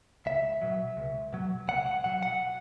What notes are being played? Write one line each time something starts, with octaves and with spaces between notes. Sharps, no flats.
C#2 E5
B2 F#3
C#2
B2 F#3
C#2 F#5
F#5
B2 F#3 F#5
F#5